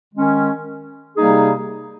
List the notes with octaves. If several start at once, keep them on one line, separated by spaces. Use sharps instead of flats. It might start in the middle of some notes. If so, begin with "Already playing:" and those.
D#3 G#3 C#4
C3 G3 A#3 D#4 G#4